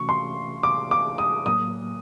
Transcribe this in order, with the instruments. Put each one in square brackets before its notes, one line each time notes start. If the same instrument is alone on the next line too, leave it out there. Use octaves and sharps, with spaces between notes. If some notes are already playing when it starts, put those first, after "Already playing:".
Already playing: [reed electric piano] C3 E3 A3 C#4 F#4 [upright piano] C#6
[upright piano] C6
D6
D6
D#6
[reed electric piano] A2 F#3 A#3 [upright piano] D#6